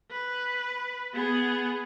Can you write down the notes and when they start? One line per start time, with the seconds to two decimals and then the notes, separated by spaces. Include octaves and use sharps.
0.11 B4
1.14 B3 G#4